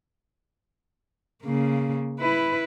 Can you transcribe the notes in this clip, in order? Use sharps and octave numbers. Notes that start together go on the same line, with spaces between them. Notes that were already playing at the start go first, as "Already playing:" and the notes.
C#3 A#3
E4 B4